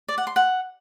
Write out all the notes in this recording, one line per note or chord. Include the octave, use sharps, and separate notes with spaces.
D5
F#5
C6
F#5